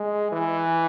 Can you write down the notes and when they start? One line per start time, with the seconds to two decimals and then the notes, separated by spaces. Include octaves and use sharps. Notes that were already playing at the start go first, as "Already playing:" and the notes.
Already playing: G#3
0.32 E3